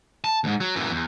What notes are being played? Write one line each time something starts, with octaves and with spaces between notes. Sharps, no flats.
A5
D#2 G#2
F#3
F#2 E3
E2